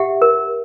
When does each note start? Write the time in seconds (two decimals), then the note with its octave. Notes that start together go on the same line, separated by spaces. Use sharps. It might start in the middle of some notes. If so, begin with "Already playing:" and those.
Already playing: G4 E5 F#5
0.22 A#4